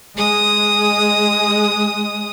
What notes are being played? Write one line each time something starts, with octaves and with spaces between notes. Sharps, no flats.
G#3 D#6